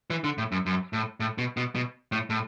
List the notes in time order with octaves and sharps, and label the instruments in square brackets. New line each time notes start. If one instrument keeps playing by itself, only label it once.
[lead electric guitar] E3
D3
A2
F#2
F#2
A2
A2
B2
B2
B2
A2
A2